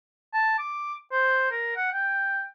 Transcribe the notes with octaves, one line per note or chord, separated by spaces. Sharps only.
A5
D6
C5
A#4
F#5
G5